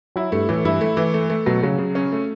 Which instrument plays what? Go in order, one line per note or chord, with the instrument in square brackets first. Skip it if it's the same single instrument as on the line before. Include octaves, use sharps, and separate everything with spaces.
[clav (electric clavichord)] F#3 [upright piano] E4
[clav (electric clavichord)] G2 [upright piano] A3
[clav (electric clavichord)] A2 [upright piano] E3
[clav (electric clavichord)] G2 [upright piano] E4
[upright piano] A3
E3
A3
A3
[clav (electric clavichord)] B2 [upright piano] F#3
[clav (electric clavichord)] C#3 [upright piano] F#3
[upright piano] C#3
C#4
A3